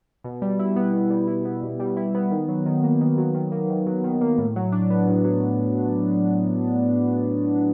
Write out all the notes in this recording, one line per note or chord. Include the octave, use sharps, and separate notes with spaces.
B2
G3
E4
B3
B2
G3
E4
B3
B2
G3
E4
B3
D#3
F#3
D#3
A#3
D#3
F#3
D#3
A#3
D#3
F#3
D#3
A#3
A2
F#3
D4
B3
A2
F#3